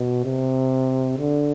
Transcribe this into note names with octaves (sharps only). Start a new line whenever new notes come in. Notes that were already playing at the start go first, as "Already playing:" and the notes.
Already playing: B2
C3
D3